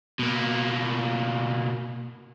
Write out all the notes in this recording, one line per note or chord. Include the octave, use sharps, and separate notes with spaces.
B2 A#3